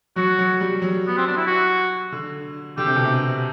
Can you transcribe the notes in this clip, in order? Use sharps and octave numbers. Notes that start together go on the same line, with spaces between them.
F#3 F#4
F#3
G3
F#3
B3
C4
D4
E4
F#4
D3
D3 G4
C3
B2
C3